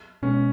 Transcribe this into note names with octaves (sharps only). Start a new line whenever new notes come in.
B2 G#3 B3 C#4